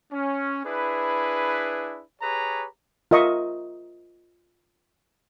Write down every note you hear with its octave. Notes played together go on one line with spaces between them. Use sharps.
C#4
D4 E4 G#4 B4
G4 G#4 B4 C#5 A#5
F4 A#4 D#5 E5 C#6 D#6